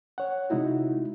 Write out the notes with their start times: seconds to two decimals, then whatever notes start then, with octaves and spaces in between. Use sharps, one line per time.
0.18 C#5 F#5
0.50 C3 G#3 D#4 E4 F#4